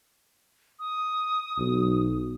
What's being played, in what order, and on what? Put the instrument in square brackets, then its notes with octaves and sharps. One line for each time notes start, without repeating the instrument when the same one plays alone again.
[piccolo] D#6
[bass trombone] B1